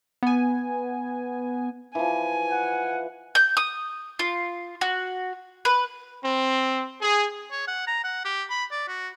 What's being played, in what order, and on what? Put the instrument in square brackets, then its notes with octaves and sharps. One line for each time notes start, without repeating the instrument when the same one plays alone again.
[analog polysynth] B3 G#5
[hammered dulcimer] E3 F3 [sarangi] G#5
[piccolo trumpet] F#5
[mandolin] G6
D#6
F4
F#4
B4
[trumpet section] C4
G#4
[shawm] C#5
F#5
A#5
F#5
G4
B5
D5
F#4